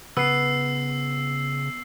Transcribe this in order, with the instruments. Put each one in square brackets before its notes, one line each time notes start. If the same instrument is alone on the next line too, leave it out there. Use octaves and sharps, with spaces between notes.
[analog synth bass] C#3 [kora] B3 [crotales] E6 C7